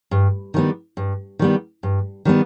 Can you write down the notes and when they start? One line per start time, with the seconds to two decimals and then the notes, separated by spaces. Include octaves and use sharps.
0.11 G2
0.54 D#3 G3 B3
0.97 G2
1.39 D#3 G3 B3
1.83 G2
2.25 D#3 G3 B3